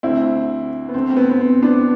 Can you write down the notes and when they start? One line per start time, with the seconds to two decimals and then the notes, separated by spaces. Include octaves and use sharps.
0.03 D2 D3 C4 E4
0.89 B3
0.94 D2 D3 C4
1.10 C4
1.17 B3
1.30 B3
1.40 C4
1.62 B3 D4